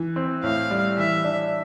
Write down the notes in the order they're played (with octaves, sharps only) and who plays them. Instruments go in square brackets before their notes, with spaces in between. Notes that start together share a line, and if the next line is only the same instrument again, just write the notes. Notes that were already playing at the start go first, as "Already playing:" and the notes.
Already playing: [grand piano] E3
C4
[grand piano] A2 [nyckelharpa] F5
[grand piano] G3
[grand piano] E3 [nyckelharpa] E5
[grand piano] D4